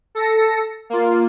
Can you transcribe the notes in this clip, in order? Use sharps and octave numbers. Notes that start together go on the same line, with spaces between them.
A4 A#6 C#7
A#3 F4